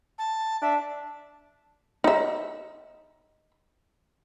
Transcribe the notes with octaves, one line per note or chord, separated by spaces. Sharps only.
A5
D4 E5
D#4 E5